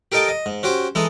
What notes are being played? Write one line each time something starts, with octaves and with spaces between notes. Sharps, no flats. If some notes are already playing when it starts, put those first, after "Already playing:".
G4 A4 A#4 D#5 G5 A5
D#5
G#2
C#4 F#4 G4 C5
E3 G#3 D#4 A4